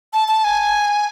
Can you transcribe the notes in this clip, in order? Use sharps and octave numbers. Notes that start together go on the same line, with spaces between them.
A5
A5
G#5